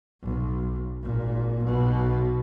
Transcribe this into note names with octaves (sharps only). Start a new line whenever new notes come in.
B1
G#1 A#2
B1 B2